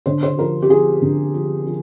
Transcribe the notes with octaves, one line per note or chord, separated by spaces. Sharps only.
D3 C5
C5
F3 A#4
G4
F3 G#4
D3
F3
F3